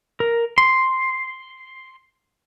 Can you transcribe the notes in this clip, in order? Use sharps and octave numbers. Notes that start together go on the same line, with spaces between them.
A#4
C6